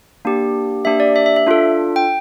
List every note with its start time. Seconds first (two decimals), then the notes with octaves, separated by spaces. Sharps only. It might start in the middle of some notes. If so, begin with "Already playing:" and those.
0.25 A#3 D4 G4
0.85 A#3 D4 G4 E5
1.00 D5
1.16 E5
1.26 E5
1.36 E5
1.46 D4 F4 A4
1.96 G5